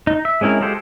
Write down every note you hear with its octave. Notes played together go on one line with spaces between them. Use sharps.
D#4
E5
G#3 C4 C#4 E4 A#4
G#3 F4 G4 A4 C5